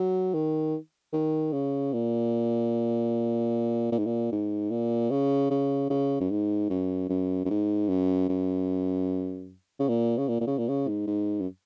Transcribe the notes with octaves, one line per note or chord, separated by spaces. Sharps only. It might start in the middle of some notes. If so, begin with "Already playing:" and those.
Already playing: F#3
D#3
D#3
C#3
A#2
A#2
G#2
A#2
G#2
A#2
C#3
C#3
C#3
F#2
G#2
F#2
F#2
F#2
G#2
F#2
F#2
C#3
A#2
C#3
A#2
A#2
C#3
A#2
C#3
G#2
G#2
F#2